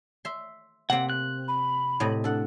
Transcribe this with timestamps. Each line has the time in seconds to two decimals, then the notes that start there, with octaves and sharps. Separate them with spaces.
0.25 E5 C6
0.90 C3 A#3 C4 F#5
1.10 F#6
1.48 B5
2.00 A2 C3 D#5
2.24 D4 A4 F#5